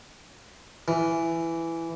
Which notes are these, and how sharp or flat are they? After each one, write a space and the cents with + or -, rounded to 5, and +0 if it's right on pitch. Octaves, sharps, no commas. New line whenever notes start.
E3 +10